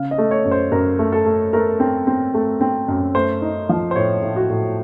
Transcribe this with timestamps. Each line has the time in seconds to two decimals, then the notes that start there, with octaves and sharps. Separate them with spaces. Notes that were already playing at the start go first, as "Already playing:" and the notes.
Already playing: C#3 F5
0.11 D#5
0.18 A3
0.31 C#5
0.45 F#2
0.51 C5
0.72 F#2 A#4
0.99 A3
1.12 A4
1.26 A3
1.53 A3 A#4
1.80 C4
2.07 C4
2.34 A3
2.61 C4
2.88 F#2
3.15 A3 C5
3.42 D#4
3.69 F3
3.91 C5
3.96 A2 C#5
4.23 A2
4.36 F#4
4.50 A2